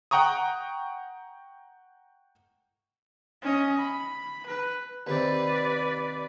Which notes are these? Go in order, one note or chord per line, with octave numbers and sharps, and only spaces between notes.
F#5 G5 A#5 C#6 D#6
C#4 D#5
B5
B4
D#2 C3 B4 D5